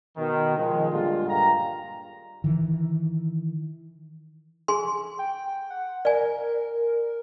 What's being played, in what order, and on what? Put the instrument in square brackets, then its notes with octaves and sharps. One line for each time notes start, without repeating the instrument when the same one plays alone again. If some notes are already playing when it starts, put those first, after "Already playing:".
[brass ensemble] B2 D#3
D#3 F3 G#3
A#2 D3 G3 G#3 F4
G2 A#2 F5 G5 A#5
[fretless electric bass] D#3 E3
[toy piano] G#4 G#5 C6
[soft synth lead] G5
F#5
[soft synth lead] A#4 [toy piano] D5 G#5